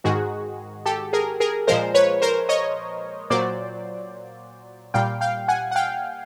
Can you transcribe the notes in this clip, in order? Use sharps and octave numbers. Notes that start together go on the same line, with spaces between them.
G#2 D#3 G#3 F#4 G#4
G4 A4
G#4 A#4
G#4 A#4
A#2 F3 G#3 A#4 C5
B4 C#5
A#4 C5
C#5 D#5
A#2 F#3 C5 D5
A#2 G3 F5 G5
F5 G5
F#5 G#5
F#5
F5 G5